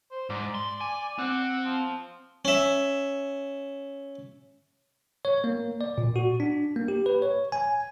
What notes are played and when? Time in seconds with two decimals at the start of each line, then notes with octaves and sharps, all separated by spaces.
0.11 C5
0.30 G#2 D5
0.55 C6
0.81 G#5
1.18 C4 F#5
1.65 F3
2.45 C#4 E5
5.25 C#5
5.44 A#3
5.81 D5
5.98 A#2
6.16 F#4
6.40 D4
6.76 A#3
6.88 G4
7.06 B4
7.22 C#5
7.52 G#5